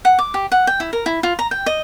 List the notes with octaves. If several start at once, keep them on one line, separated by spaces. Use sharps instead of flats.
F#5
D6
G4
F#5
G5
E4
A#4
E4
F4
A#5
G5
D#5